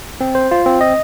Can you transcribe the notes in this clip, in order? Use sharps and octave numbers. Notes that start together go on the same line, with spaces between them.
C4
C5
F4
C4
D#5